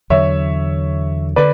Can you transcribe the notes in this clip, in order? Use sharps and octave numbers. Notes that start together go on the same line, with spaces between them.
E2 D3 F#3 C#5 E5
D3 B4 D5